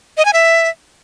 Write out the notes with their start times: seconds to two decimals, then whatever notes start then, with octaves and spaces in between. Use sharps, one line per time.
0.17 D#5
0.25 G#5
0.33 E5